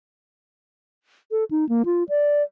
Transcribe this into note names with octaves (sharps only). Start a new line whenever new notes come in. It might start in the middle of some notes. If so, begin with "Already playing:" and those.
A4
D#4
A#3
F4
D5